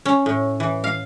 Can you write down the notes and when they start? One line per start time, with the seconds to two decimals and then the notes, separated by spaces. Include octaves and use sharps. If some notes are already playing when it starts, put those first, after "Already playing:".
0.05 C#4
0.26 A2
0.60 E3
0.84 F5